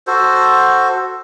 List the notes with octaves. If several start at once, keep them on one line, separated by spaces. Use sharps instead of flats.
F#4 A4 C5